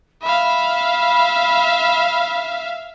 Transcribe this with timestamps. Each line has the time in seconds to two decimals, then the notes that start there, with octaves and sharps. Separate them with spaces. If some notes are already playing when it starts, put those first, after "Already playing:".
0.22 E5 F5 B5